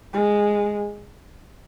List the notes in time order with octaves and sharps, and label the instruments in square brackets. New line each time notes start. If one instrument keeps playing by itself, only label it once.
[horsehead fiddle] G#3